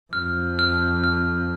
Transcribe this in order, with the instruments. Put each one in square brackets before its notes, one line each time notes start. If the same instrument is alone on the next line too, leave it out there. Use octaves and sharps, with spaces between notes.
[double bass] F2 [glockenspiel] F6
[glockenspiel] F6
F6